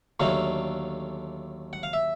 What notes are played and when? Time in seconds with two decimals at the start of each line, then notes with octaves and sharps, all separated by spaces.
0.20 D#2 D3 F#3 A3 F5
1.73 F#5
1.83 F5
1.93 E5